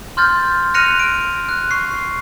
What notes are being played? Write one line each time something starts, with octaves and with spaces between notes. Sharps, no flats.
C6 F6 G6 A6
F6 F#6 A#6 C#7 D#7 F7
D7
F#6
C#6 C7